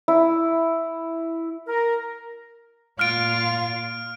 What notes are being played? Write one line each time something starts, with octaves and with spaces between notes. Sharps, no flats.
E4
A#4
A#2 F4 F6 D7